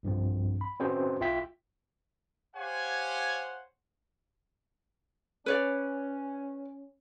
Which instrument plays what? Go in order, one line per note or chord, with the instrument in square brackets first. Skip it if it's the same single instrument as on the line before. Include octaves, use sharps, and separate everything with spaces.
[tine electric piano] B1 G2 F3 C4
B5
C4 C#4 F#4 G#4 B4 C5
B1 F4 E5 G5 E6 B6
[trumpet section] G4 C5 C#5 F5 F#5 G#5
[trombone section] C#4 [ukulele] B4 C#5 D5